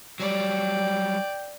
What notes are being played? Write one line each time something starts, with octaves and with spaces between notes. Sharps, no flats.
F#3 G3 D5 G5